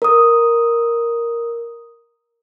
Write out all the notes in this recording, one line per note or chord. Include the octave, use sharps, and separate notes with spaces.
A#4 D#6